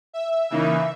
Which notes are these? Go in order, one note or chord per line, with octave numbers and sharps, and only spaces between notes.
E5
C#3 E3 A#3 D#4